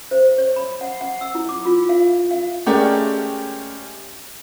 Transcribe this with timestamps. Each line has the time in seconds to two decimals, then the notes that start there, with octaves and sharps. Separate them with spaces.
0.11 C5
0.38 C#5
0.56 B5
0.81 F#5
1.01 F#5
1.21 E6
1.35 E4
1.49 D6
1.65 F4
1.89 F5
2.31 F5
2.66 G#3 A3 C#4 G4 A#4 D5